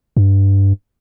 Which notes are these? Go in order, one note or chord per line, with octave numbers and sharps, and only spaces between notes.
G2